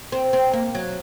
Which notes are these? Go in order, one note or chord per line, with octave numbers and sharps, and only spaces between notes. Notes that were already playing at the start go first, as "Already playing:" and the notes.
C4
C4
A#3
F#3